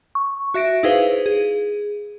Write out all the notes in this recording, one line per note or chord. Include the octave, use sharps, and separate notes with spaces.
C#6
F#4 E5 A#6 D7
D#4 E4 G#4 B4 C5 F5
G#4